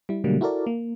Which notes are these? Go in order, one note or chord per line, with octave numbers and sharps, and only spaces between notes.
G3 E4
B2 D3 F#3 G3 A3 A#3
E4 F#4 A4 A#4 D5
A#3